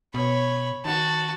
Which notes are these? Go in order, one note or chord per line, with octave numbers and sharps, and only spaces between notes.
B2 C#5 B5
D#3 F#4 A5